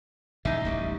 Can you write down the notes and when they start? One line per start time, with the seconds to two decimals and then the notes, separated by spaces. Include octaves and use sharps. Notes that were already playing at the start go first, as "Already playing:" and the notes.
0.45 E1 A1 C3 D#4 E5
0.65 D1 A1 G3